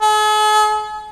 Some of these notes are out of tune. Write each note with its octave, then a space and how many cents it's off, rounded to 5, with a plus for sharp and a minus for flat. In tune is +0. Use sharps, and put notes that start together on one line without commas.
G#4 +45